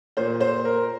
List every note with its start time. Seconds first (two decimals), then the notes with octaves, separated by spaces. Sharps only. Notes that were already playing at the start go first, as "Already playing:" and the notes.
0.17 A#2 C5
0.40 C5
0.65 A#4